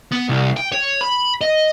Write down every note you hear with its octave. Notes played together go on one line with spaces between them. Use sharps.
B3
C2
G5
C#5
B5
D#5